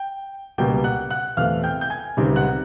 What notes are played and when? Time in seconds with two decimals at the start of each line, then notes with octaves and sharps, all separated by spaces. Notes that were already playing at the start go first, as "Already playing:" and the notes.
Already playing: G5
0.58 C#2 B2 G3 A#3 G5 G6
0.84 F#5 F#6
1.10 F#5 F#6
1.37 E2 C3 E3 A3 F5 F6
1.64 G5 G6
1.81 G6
1.90 G#5 G#6
2.17 C#2 C3 D#3 G3
2.36 F#5 F#6